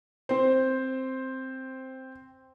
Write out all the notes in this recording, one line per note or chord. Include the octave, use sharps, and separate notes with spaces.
C4 C5